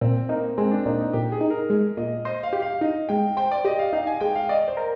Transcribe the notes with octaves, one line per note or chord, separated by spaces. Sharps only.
A#2 C4
A#3 D#4
G#3 C4
D4
A#2 D#4
D#4
A#2 G4
G#4
D#4
A#4
G#3
A#2 D#5
C5 D#5
F5
G4
F5
D#4 D#5
G#3 G5
C5 G5
D5
G4 D#5
F5
D#4 F5
G#5
G#3 G5
F5
D5 D#5
C5
A#4